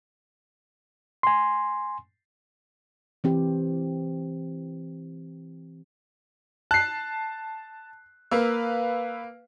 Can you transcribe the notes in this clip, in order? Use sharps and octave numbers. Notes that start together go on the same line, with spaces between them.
G#5 C6
E3 C4 G4
A5 F#6 C7
A#3 B4 F5 E6